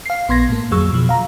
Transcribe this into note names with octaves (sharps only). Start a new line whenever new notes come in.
F5 C7
A#1 B3 C6 G#6 A#6
A2 A#3
F2 D3 F#3 G#4 C#6 E6
B2 F3
F5 A#5